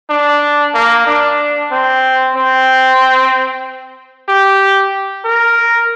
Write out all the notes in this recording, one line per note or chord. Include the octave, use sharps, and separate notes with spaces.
D4
A#3
D4
C4
C4
G4
A#4